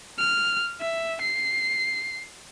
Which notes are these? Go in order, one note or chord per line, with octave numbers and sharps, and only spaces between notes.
F6
E5
C7